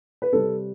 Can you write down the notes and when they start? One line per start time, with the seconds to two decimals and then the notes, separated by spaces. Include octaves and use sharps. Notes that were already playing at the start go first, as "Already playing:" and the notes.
0.22 B4
0.32 C3 G3 C4 A4